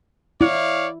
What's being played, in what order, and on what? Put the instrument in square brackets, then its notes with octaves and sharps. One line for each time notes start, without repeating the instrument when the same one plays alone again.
[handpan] E4 [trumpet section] C#5 D5 F5